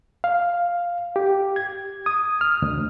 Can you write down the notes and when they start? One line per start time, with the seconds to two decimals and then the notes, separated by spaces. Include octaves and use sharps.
0.24 F5
1.16 G4
1.56 G#6
2.06 D#6
2.41 F6
2.62 D2